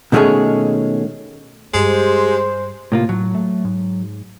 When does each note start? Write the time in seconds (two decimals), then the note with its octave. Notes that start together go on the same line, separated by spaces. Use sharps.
0.12 B2 D#3 G#3 A3 C#4 G#4
1.74 G2 G#3 G4 C5
2.92 A2 C3 A#3 F4
3.09 A2 F#3
3.35 A3
3.65 G#2